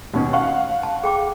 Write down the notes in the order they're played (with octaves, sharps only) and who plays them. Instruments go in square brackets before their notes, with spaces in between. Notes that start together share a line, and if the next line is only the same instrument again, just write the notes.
[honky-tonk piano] D#2 B2 C#4
[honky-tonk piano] F5 F#5 [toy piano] C#6
[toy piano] A5
G#4 G5 D6